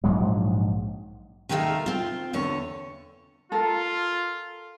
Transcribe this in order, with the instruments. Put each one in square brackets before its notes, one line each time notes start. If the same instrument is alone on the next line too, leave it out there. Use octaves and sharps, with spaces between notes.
[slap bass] A#1 G#2 F#3 G#3
[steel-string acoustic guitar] D#2 D#3 G#3 A3 F#4 F5
C4 F4
E2 D3 C#5
[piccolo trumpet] F4 [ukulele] A4 A#4